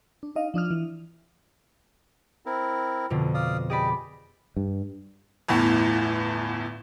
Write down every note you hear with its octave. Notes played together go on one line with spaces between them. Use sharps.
D4
D#4 D#5 F5
F3 D4 D#6 F6
E3
C4 E4 A#4
F2 B2 D3
D5 F5 D#6
G4 G#4 D5 D#5 B5
G2
G1 E2 A2